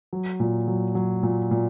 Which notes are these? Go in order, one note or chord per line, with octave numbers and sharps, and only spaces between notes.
F#3
A#2
F#3
F#3
A#2
A#2